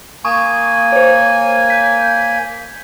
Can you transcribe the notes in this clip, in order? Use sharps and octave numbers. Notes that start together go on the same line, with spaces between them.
A#3 G#5 C#6 D#6
C5 C#5
G6 B6